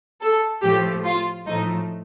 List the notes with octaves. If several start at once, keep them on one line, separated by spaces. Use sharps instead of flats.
A4
A2 F3 A3 G4
F4
A2 F3 A3 D#4